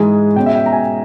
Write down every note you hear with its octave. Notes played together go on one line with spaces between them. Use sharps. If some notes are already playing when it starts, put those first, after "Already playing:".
Already playing: G#2 E3 G#3 G#5
B2 G#3 C#4 G5
E5
G5
A#5
G#5